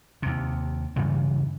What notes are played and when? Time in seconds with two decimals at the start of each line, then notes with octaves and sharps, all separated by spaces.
0.22 D#2 C3
0.96 G2 C#3 E3 G3